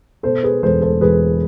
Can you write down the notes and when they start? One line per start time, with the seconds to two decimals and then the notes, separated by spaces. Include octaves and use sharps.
0.23 B2 A4 C5
0.43 G#4 B4
0.63 E1 A4 C5
0.82 A4 C5
1.01 E1 G#4 B4